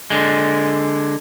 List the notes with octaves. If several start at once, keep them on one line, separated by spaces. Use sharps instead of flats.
D3 G#3